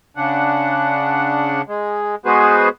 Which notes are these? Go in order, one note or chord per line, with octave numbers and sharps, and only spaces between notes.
C#3 D4 F#5
G#3
G#3 B3 F#4 G#4 B4 C5